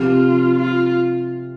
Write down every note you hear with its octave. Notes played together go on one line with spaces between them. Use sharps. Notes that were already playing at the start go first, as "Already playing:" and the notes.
Already playing: C3 F3 C4 F4 G4
F4